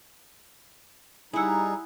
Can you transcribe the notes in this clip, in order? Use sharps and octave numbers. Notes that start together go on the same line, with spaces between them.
G3 D#4 E4 G#4 F#5 G#5 E6